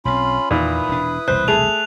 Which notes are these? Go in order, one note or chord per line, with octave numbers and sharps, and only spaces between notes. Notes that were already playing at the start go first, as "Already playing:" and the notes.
B1 G3 C4 C#4 F4 B5
E2 A#2 D#3 E4 B4 D#6
E1 D4
E1 C2 A#2 C5 F#6
A3 G#4 F7